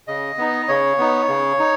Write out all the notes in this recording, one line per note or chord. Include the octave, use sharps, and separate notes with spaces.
C#3 D#5
B3 D#4
C#3 C#5
B3 D#4
C#3
D#4